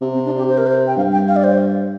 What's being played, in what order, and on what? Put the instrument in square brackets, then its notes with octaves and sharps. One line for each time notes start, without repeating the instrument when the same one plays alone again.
[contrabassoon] C3
[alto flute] C4
D4
G4
C5
A#4
C5
G5
[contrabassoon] G2 [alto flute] F5
[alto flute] G5
F5
D5
C5